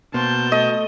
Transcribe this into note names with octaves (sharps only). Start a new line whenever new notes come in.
B2 A#3 C5 A5 G6
A3 D#5